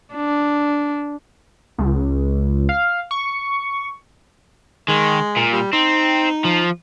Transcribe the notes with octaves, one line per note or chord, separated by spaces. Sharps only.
D4
C#2
F5
C#6
D#3 G#3
A#2
G3
C4 D#4
F3